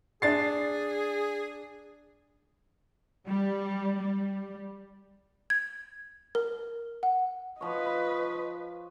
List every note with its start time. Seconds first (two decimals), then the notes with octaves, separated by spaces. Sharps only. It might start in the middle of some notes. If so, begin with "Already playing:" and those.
0.22 D4 G#4 A6 C7
3.27 G3
3.98 G3
5.50 G#6
6.35 A#4
7.03 F#5
7.61 F3 B4 C#5 D#5